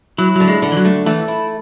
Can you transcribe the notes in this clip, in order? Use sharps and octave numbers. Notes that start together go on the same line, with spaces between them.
F#3 E4
D3 F#3
G#3
D3
E3
F#3
A3
E3 A3
E4